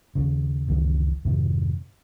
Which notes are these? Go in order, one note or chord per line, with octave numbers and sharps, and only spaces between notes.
D#2 C#3
F#1 C#2 D#3 E3
F2 G#2 C3 D#3